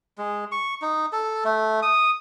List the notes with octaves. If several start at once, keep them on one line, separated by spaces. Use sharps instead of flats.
G#3
C#6
D#4
A4
A3
D#6